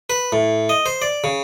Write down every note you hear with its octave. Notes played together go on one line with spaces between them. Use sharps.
B4
A2
D#5
C5
D5
C#3